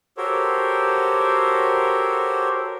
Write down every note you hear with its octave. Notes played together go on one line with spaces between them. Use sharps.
F#4 G4 A4 A#4 C5 C#5